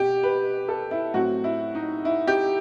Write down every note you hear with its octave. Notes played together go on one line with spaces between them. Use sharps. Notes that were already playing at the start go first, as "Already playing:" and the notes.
Already playing: B2 G4
B4
A4
E4
A2 F#3 C4 F#4
E4
D#4
E4
G4